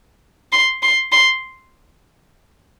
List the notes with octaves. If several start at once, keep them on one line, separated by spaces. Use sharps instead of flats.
C6
C6
C6